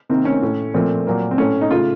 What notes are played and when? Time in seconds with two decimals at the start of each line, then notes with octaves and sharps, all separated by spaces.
0.09 C3 D#3 A#3 C4
0.25 C#4
0.42 A2 A3
0.74 A#2 F3 A3 C4
1.07 A#2 F#3 A#3
1.31 C4
1.38 A2 A3 C#4
1.61 D#4
1.70 C#3 A3 F4